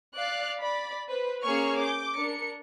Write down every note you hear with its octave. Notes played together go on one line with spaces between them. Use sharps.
D5 F5 F#6
D5 B5
B4 C5
A#3 C#4 G#4 C#5 C#6 F6
D6 G6
D4 A#4 C#7